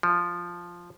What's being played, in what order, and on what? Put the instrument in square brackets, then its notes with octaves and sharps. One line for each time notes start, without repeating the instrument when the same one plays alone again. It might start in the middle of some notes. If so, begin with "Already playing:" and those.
[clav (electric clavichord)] F3